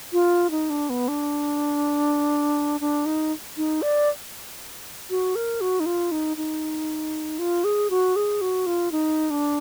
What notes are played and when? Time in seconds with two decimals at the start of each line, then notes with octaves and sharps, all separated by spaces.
0.13 F4
0.51 D#4
0.70 D4
0.90 B3
1.08 D4
2.81 D4
3.06 D#4
3.57 D#4
3.82 D5
5.10 F#4
5.36 A#4
5.61 F#4
5.80 D#4
5.86 F4
6.12 D#4
6.37 D#4
7.39 F4
7.64 G#4
7.90 F#4
8.16 G#4
8.41 F#4
8.66 F4
8.92 D#4
9.30 D4